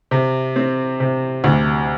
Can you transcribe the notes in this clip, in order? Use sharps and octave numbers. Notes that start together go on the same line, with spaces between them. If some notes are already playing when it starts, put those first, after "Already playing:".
C3
C4
C3
D2